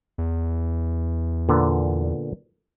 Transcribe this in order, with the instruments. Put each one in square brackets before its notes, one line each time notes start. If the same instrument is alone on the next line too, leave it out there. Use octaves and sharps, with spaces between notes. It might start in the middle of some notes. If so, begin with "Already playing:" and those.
[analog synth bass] E2
[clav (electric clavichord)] A#2 D3 B3